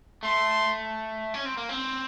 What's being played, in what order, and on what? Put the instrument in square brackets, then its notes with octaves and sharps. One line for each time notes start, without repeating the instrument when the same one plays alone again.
[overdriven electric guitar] A3 [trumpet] C6
[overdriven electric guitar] C#4
C4
A#3
C4